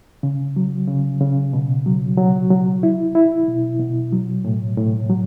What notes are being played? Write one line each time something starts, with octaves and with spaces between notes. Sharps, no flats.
C#3
F#3
C#3
C#3
B2
F#3
F#3
F#3
E4
E4
B2
B2
F#3
A2
A2
F#3